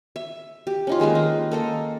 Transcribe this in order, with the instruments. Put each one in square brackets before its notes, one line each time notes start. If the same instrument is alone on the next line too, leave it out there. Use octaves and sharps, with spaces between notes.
[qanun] E5
G4
C#4 D#4 F4
D#3 G#3 A#3 B4
D#4
A#3 A4 D#5